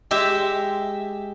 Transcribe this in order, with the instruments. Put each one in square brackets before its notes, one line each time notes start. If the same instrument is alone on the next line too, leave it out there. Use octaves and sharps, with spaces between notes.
[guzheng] G#3 G4 E5